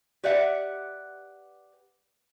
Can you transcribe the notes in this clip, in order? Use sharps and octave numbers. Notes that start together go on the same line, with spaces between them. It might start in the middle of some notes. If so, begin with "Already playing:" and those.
G4 B4 D5 E5 F#5